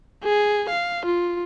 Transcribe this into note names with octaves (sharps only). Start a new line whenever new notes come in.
G#4
F5
F4